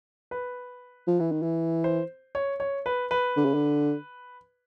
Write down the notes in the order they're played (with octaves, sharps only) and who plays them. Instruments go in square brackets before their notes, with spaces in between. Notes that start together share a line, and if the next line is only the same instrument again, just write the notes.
[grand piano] B4
[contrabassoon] F3
E3
D#3
E3
[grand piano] C5
C#5
C#5
B4
B4
[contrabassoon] D3
C#3
D3